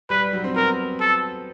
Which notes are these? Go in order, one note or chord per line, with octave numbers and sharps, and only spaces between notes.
G3 B4
F#3
C4
B3 A#4
A4